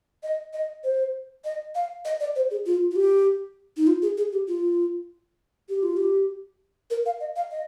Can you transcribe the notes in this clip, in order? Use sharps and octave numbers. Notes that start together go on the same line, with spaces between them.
D#5
D#5
C5
D#5
F5
D#5
D5
C5
G#4
F4
F4
G4
D#4
F4
G#4
G#4
G4
F4
G4
F4
G4
A#4
F5
D#5
F5
D#5